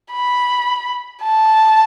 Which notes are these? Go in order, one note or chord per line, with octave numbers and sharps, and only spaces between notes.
B5
A5